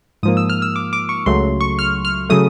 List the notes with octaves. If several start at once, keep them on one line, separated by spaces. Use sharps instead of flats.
G#2 F3 A#3 D#6
E6
F6
E6
D6
D6
C#6
C#2 C#3 F#3 A3 C6
C#6
F6
F6
C#3 F#3 A3 D#6